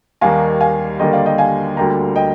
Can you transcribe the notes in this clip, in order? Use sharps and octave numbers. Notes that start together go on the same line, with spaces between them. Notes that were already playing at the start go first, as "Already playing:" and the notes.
D#2 D#3 G3 A#3 F5 G#5
F5 G#5
D#2 D3 G3 A#3 D#5 G5
D5 F5
D#5 G5
F5 G#5
D2 D3 G3 A#3 G5 A#5
D#5 G5